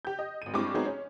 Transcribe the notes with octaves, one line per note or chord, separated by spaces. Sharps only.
G4 G6
D#5
G#1 D#7
G2 G#3 C4 E4 C#6 D6
F#3 G#3 B3 C4 D#4 G#4
C#4